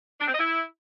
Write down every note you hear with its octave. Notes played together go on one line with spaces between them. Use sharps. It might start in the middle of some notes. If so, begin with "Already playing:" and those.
D4
C4
D#5
E4